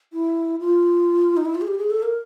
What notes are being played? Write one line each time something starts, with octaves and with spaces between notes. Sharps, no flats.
E4
F4
D#4
E4
F4
G#4
G4
G#4
A4
A#4